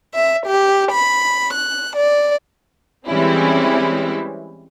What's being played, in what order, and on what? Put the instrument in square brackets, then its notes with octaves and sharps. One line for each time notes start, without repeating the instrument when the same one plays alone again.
[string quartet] E5
G4
B5
F#6
D5
[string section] E3 G3 G#3 C4 C#4 E4